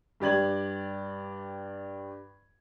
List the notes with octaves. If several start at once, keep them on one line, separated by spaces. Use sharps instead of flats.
G2 G4 D5 G#6 F#7